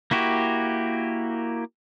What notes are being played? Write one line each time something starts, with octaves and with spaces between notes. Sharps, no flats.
A#3 E4 F#4 G4